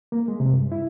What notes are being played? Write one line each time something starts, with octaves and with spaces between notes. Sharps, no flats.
A#3
G#3
C3
G2
E4